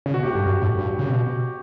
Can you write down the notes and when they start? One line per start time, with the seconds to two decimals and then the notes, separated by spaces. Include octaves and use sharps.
0.06 C#3
0.14 B2 F#4
0.23 A2 G4
0.32 G2 F#4
0.46 F#2
0.62 A2
0.78 G2
0.99 C#3
1.10 B2